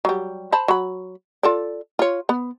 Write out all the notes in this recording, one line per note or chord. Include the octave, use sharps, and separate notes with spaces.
F#3 G3
C5 A5 B5
F#3 B5
F4 A4 D5
F4 C#5
B3